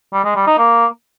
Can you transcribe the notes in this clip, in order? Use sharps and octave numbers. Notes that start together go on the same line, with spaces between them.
G3
G#3
G3
D#4
A#3